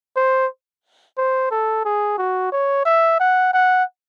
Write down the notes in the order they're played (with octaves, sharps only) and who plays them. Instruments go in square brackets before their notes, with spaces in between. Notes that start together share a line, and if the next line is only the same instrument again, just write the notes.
[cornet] C5
C5
A4
G#4
F#4
C#5
E5
F#5
F#5